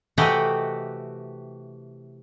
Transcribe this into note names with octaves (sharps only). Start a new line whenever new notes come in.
C3 E3 A3 F#4 G4 D#5